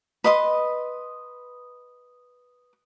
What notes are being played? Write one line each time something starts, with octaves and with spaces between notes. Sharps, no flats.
B4 D#5 C6 D#6